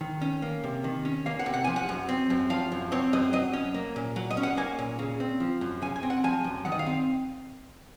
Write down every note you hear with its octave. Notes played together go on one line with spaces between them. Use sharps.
D#3
C#4
A#3
C3
D#3
C#4
A#3 F5
F#5
C3
F#5
F3 G#5
F#5
F#2
C4
F#2
F3 F5
F#2
C4 C#5
F#2 D#5
F#3 D#5
C#4
A#3
A#2
F#3
D#5
C#4
F#5
A#3 G#5
A#2
C#3
C4
F3
F#2
C#3 G#5
G#5
C4
F#5
F3 G#5
F#2
D#3 F#5
D#5
F5
C4